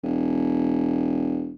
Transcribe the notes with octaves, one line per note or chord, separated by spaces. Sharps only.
E1